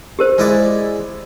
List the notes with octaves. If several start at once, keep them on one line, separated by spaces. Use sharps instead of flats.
G4 A#4 C5
G#3 E4 D5